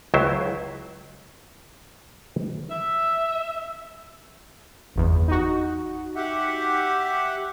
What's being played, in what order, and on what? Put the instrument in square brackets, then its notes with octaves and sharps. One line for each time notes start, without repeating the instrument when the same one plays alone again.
[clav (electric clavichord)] C#2 F#3 E4 C5
[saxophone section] E5
[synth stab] G1 E2
D#4 F#4
[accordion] G4 E5 F#5